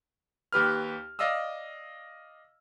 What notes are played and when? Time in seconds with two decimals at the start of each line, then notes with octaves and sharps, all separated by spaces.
0.53 D#2 G4 B4 F6
1.19 D5 D#5 F5 D#6 E6